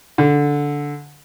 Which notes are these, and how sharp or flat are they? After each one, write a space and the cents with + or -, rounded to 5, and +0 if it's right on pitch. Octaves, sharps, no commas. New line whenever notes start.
D3 -10